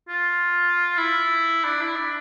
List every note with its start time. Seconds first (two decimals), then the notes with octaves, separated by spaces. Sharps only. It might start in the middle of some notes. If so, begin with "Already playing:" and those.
0.09 F4
0.98 E4
1.64 D4
1.81 E4
1.96 D4